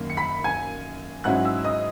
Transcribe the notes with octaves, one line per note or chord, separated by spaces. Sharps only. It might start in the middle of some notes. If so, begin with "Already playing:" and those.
Already playing: F#2 D#3 A#3
C#7
B5 B6
G#5 G#6
G#2 F#3 C#4 E4 F#5 F#6
E5 E6
D#5 D#6